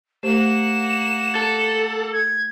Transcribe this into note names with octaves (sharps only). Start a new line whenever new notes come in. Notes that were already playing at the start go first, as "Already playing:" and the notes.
A3 A#3 G4 C5 F#5 E7
A4
G#6